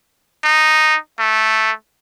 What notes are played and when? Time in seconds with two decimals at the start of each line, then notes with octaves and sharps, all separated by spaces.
0.44 D#4
1.19 A3